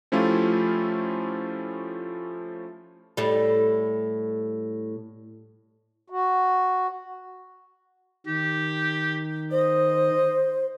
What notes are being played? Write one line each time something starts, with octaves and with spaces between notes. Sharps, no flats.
F3 A3 C#4 E4 F4 G4
A2 G3
F#4
D#3 G4
C5 D#5